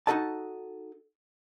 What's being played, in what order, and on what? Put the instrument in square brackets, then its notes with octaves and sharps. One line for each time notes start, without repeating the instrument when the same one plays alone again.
[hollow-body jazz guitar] D#4 E4 F#4 A4 D#5 A5